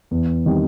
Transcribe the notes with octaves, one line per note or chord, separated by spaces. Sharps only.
E2
C3 D#3 G3